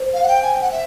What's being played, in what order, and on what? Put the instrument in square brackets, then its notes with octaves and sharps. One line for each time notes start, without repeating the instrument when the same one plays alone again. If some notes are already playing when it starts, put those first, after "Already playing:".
Already playing: [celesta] C5
[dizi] F5
F#5
G5
G#5
G5
F#5
E5